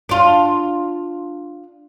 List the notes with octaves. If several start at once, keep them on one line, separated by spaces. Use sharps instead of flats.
D4 F4